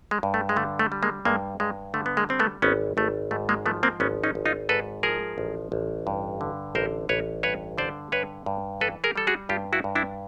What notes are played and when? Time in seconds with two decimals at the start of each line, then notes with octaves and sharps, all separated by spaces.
0.11 G#3
0.23 G2
0.34 A3
0.49 G#3
0.56 D3 A3
0.79 A3
0.92 G3
1.03 G#3 A#3
1.25 G2 G#3 A#3
1.60 G2 G#3
1.94 D3 A3
2.06 B3
2.17 G#3 A#3
2.29 G3 C4
2.39 A3 B3
2.62 G#1 B3 C#4
2.97 G#1 A3
3.31 G#2 A3
3.49 G#3 A#3
3.66 F3 A3 B3
3.83 A#3 C4
4.00 G#1 B3 C#4
4.24 C#4 D#4
4.35 G#1
4.46 D#4 F4
4.69 G#2 A4 B4
5.03 F3 G#4 A#4
5.38 A1
5.72 A1
6.07 G2
6.41 D3
6.75 A1 A#4 C5
7.09 A1 B4 C#5
7.43 G2 B4 C#5
7.78 D3 C5 D5
8.12 G2 B4 C#5
8.46 G2
8.80 E3 A4 B4
9.04 G#4 A#4
9.16 G3 A4
9.27 F#4 G#4
9.49 G2 F4 G4
9.73 E4 F#4
9.84 G2
9.95 D4 E4